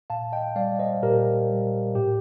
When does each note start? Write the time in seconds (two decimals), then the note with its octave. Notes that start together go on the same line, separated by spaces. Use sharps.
0.10 A#2 F5 A5
0.32 D#5 G5
0.56 G3 D5 F5
0.79 C5 D#5
1.02 A#2 G4 A#4
1.49 G3
1.95 A2 G4